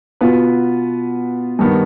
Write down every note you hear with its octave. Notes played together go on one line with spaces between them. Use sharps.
B2 B3 F4 B4
G2 D#3 B3